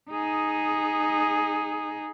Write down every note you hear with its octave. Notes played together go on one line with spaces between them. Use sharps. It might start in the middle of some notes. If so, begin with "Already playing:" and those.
D#4 G#4